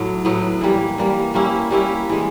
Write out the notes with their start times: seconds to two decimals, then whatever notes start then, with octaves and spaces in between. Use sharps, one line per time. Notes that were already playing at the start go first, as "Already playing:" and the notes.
Already playing: A2 F#3
0.25 A2 F#3 B3
0.61 E3 G3 A#3
0.98 E3 G3 A#3
1.34 G3 A#3 C#4 E4
1.71 G3 A#3 C#4 E4
2.09 E3 G#3